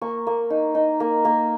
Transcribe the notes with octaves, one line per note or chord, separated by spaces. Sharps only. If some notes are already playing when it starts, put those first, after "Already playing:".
A#3 C#6
A#3
D#4
D#4
A#3
A#3